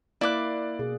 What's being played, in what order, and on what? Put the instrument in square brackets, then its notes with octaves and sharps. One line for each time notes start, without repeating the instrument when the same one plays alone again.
[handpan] A#3 F5 [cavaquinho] E4 D6 [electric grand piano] D5 F#6
[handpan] B2 G#4